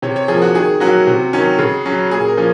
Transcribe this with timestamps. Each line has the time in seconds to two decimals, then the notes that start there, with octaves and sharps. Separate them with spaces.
0.02 C3 C#5
0.16 C#5
0.28 F3 A#3 G#4
0.42 F#4
0.55 D#3 G#4
0.80 F#3 A#3 C#4 F#4
1.07 C3
1.33 D#3 F#3 C#4
1.59 C#3
1.86 F#3 C#4
2.11 A#2 G#4
2.28 A#4
2.37 F3 A#3 C#4